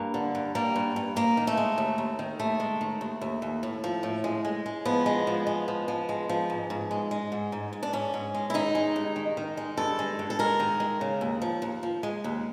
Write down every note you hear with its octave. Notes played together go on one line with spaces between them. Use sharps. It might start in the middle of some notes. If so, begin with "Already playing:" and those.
Already playing: G2 A#3
D3
G2
G3 A#3
G2
G2
D#2 A#3
D#3
A3
G#3
D#2
D#2
D#3
D#2 A3
G#3
D#3
D#2
D#2
D#2
A2
F3
A2
G#3
G#3
G#3
F3 B3
G#3
F3
G#3
F3
F3
G#3
F3
G#2
G#2
G#3
G#3
G#2
G#2
G#2
D4
G#2 C#4
G#2
G#3
E4
D#3 D#4
G#3
G2
D#3
D#3
G#3
G2 A4
G#3
G2
A4
G#3 A#4
D#3
G#3
C#3
D#2
F3
D#2
F3
G#3
D#2